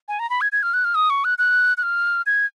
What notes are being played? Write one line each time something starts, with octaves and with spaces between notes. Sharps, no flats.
G#5
A#5
B5
G#6
G#6
F6
F#6
F6
D#6
C#6
F#6
F#6
F#6
F6
G#6